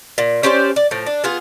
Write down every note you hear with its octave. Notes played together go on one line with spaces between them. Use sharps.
A#2
C#4 G4 C5 D5
D5
A2 F3
D4
B3 F4 G#4